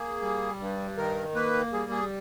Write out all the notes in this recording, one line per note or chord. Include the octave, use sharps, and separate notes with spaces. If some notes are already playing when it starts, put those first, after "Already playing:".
Already playing: A#3 G#4
G3
G2
D#3 A#4
A#3 B4
G3 G#4
G#4